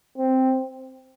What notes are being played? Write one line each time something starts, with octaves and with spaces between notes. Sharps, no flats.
C4